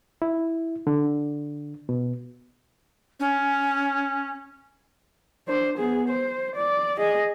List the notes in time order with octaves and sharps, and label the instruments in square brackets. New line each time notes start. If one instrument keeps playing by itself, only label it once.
[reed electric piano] E4
D3
B2
[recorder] C#4
[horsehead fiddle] D4 C5
B3 G#4
C5
D5
G#4 D#5